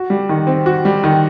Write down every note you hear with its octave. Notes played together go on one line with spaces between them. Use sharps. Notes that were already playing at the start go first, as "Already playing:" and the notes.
Already playing: F#4
G3
D#3
C4
F#4
G3
D#3